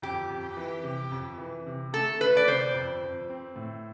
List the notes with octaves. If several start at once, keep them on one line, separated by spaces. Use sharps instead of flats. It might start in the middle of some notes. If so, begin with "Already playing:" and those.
F2 G4
F2
E3
C3
F2
E3
C3
A3 A4
A3 B4
D5
C3 C5
F2
F2
C4
A2